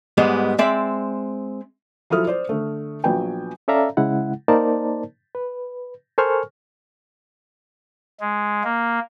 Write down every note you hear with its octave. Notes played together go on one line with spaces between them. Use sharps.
G#2 G3 G#3 B3
G#3 C4 D5 E5
F3 F#3 E4 A4 D#6 F6
C5 D5
D3 A3
A#1 F#3 B3 B4 G5 G#5
C#4 A4 D5 E5 F5 A#5
C#3 G#3 E4 F#5
A#3 D#4 A#4 C5 D5 A5
B4
A4 A#4 C5 G#5 C#6 F6
G#3
A#3